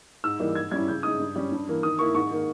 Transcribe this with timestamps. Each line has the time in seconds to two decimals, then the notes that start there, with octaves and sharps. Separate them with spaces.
0.24 G#2 E6
0.40 E3 G3 A#3 D#4
0.55 G#2 G#6
0.71 G3 C#4 E4 G#6
0.88 C#3 G6
1.03 G#3 D#4 D#6
1.20 G2
1.36 G3 C#4
1.52 G2
1.68 E3 A#3
1.83 D#3 D#6
1.99 A#3 E4 C#6
2.15 G#2 C#6
2.31 D#3 A#3